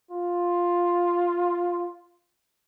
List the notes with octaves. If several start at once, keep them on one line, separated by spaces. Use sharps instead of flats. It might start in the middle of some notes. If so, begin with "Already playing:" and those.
F4